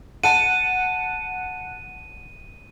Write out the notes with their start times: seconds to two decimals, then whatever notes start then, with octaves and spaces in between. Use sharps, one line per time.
0.24 F#5 A5 D#7